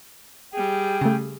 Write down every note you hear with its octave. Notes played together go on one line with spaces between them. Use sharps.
G3 G#4 G5
C#3 A3